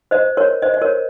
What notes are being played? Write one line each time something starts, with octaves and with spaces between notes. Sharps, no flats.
C5 D#5
A#4 C#5
C5 D#5
D#5
A#4 C#5